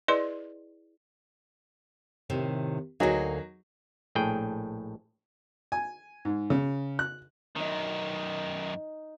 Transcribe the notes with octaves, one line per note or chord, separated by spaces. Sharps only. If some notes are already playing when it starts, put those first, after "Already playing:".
E4 G#4 B4 D5 D#5 C6
A2 C3 D#3
D2 F#3 A#3 D#4 G#4
A#1 A2 G#4 G5
G#5
G#2
C#3
F#6
F#2 D#3 D#4 D#5